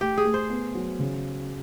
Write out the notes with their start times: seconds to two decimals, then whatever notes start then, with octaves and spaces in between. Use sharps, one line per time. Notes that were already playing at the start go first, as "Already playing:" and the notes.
0.01 A3 G4
0.18 G#4
0.25 A3
0.34 C5
0.50 B3
0.75 F#3
0.99 C#3